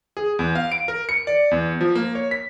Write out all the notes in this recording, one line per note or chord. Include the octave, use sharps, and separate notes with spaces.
G#4
E2
F5
D7
A#4
C#7
D5
E2
F3
A#3
C#5
B6